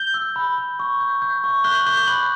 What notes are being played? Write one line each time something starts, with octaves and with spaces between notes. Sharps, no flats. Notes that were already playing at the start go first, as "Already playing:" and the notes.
Already playing: G6 G7
E6
B5
B5
C#6
G6
G6
C#6
F#6 G6 G7
F#6 F#7
D6 G6 G7
G6 G7
B5 F#6 F#7